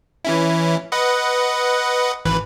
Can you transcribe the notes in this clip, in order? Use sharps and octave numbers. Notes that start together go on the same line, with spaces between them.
E3 C#4 E4
B4 D#5 F#5
G#1 E3 B4